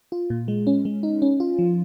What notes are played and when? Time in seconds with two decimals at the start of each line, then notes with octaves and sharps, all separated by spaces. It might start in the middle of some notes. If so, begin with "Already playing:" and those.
0.12 F4
0.30 A#2
0.48 G#3
0.67 C#4
0.85 G#3
1.03 D#4
1.22 C#4
1.40 F4
1.59 F3